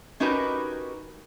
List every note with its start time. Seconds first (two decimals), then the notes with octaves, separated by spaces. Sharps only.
0.20 C#4 D#4 F#4 G4 A#4 B4